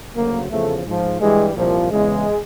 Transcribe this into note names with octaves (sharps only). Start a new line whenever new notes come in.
D2 C#3 F#3 A#3
E2 C#3 F3 A3
G#2 F3
G2 E3 G3 G#3
C2 A#2 F3
E2 C#3 E3 G#3